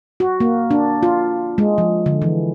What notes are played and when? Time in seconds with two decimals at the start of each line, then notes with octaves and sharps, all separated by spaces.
0.20 F#4
0.40 A#3
0.71 D4
1.03 F4
1.58 G#3
1.78 F3
2.06 D3
2.22 E3